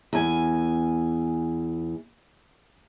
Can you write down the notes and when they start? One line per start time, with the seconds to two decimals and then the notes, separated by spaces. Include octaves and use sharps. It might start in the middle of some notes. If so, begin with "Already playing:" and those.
0.13 E2 G#5